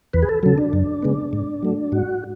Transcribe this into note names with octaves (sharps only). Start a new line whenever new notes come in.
E2 B4
G#4
A4
C#3 F#3 A4
D4
F#2
C#3 G#3 B3
G#2
F#3 A3
G#2 F#4